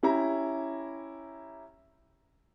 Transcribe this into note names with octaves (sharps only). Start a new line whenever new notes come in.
C#4 E4 G4 A#5